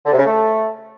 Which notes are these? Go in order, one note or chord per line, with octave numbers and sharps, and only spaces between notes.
D3
C3
C#3
A3